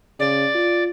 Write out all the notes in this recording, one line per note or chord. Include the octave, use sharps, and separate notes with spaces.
C#3 D5
F4